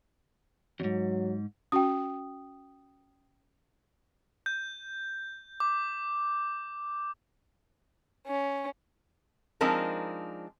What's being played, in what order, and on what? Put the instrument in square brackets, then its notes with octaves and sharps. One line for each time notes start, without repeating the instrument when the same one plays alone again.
[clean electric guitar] F2 G#2 [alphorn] F#3
[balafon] C#4 F#4 [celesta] G5 D#6
[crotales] G6
D6
[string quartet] C#4
[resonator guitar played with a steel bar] F3 G#3 C4 D4 D#4 A#4